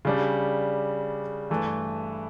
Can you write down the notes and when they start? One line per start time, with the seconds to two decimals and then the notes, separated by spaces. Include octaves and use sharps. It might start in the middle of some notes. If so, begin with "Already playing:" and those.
0.05 C#3 G3 D4
1.50 G2 E3 A3